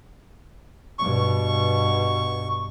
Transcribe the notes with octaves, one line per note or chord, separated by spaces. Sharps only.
G2 B2 C#6